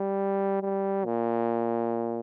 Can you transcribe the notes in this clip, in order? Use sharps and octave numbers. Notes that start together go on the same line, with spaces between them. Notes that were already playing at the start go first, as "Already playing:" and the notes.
Already playing: G3
G3
A#2